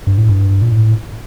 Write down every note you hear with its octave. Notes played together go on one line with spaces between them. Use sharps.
G2
A2
G2
A#2
A2